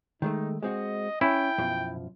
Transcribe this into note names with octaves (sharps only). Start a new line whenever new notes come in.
D#3 G#3 A3 D#4
G#3 C4 F#4 D#5
C#4 E4 G5
F#2 B2 F3